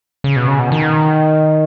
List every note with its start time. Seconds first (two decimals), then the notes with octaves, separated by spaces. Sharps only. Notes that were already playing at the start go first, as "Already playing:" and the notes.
0.24 C#3
0.36 B2
0.48 C#3
0.59 B2
0.72 D#3